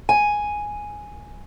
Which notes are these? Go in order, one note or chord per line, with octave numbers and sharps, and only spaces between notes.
G#5